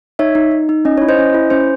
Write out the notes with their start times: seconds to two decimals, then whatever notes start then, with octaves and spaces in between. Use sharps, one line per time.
0.19 D#4 C#5 E5
0.35 D#4
0.51 D#4
0.69 D#4
0.85 C#4 D#5
0.98 E4 C#5
1.09 C5 D#5
1.19 C#4
1.34 E4
1.50 C#4 C5